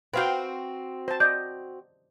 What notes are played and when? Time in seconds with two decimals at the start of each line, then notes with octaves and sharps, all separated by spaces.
0.14 C4 F#4 B4 F5 G5
1.08 C5 A5
1.20 D5 D#5 G6